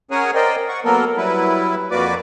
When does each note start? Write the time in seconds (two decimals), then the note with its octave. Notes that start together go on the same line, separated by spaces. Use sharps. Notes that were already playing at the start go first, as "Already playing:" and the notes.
0.11 C#4 G#4 A#4 C#5 F#5 G#5
0.35 A#4 C5 D5 D#5 G5
0.69 F#5 C#6
0.85 F#3 A#3 B3 A4 A#4
1.17 F#3 G3 E4 B4
1.91 F2 A#3 F#4 B4 D5 D6